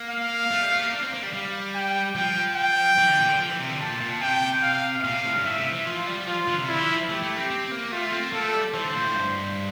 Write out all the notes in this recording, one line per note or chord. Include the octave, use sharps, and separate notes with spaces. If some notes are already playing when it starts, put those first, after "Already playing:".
Already playing: A#3
F5
A3
G3
A3
A#3
D4
C4
A#3
G3
G3 F5
G5
F3 G5
G5
E3
D3
A#2
D3
F3
E3
C3
D3
A#2 A5
A#2
C3 G5
F5
A#2 F5
C3
A2
G2
A2 E5
C3
E3
F3 F4
G3
F3 F4
D3
C3
D3 E4
E3
F3
A3 G4
A3
C4
C4
A#3
A3 F4
C4
A#3 A4
A3
G3
E3 C5
D3
A#2
A2
G2